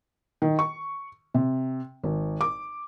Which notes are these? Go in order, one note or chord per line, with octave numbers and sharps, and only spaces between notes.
D#3
C#6
C3
G#1
D6